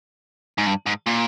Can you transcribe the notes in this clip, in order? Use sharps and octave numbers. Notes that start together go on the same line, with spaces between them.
G#2
G2
G#2
A#2